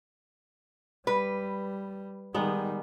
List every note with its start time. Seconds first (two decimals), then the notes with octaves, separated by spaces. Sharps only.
1.07 G3 B4
2.34 D#3 G3 G#3 B3 D#4